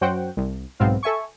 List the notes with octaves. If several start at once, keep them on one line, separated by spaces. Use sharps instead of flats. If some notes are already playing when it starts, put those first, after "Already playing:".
F#2 F#3 F#4 C5 F#5 G5
C2
B1 G#2 B3 C4 F5
A4 E5 G#5 C#6